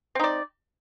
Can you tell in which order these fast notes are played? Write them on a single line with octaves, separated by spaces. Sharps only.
C4 D#4 D5